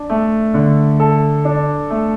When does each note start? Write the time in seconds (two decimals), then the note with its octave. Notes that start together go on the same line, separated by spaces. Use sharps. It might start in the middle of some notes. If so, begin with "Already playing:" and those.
Already playing: D4
0.10 A3
0.54 D3
1.00 A4
1.45 D4
1.90 A3